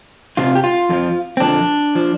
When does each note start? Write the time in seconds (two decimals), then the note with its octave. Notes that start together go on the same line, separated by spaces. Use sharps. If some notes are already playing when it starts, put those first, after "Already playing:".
0.37 F2 C3 F3 F4
0.55 G4
0.64 F4
0.89 F2 D3 F3
1.37 C4
1.40 F2 D3 F3 D4
1.95 F3